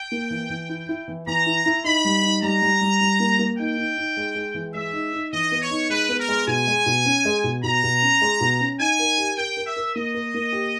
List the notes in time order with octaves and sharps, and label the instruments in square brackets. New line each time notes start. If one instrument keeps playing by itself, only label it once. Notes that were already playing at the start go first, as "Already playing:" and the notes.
Already playing: [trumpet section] G5
[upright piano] A#3
E3
E3
E4
E4
E3
[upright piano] E3 [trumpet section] A#5
[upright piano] E4
E4
[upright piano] D#4 [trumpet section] B5
[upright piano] G3
D#4
[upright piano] G3 [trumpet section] A#5
[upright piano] G3
G3
G3
A#3
A#3
[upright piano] D#4 [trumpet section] G5
[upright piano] D#4
D#4
G#3
G#3
E3
[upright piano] G#3 [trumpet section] E5
[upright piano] D#4
D#4
[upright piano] E3 [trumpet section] D#5
[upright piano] B3
[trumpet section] C#5
[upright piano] D#4
[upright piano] G#3 [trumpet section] B4
[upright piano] B3
[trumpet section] A#4
[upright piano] G#3
[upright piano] B2 [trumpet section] G#5
[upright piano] G#3
B2
C#4
G#3
B2
[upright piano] B2 [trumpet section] A#5
[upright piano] B2
C#4
G#3
B2
C#4
[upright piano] D#4 [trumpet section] G#5
[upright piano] A#4
G4
[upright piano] A#4 [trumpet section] G5
[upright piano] A#4
[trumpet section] E5
[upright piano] A#4
[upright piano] A#3 [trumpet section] D#5
[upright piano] A#4
A#3
G4